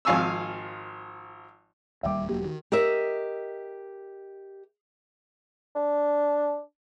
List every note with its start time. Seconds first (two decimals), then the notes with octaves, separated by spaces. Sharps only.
0.05 G#1 F3 F5 G#5 C#6 E6
2.03 D1 D#2 G3 E5 G5 D6
2.29 E1 F#3 A#3 F#4 G4
2.44 D#3 F#4
2.72 G4 A#4 D#5 E5
5.76 D4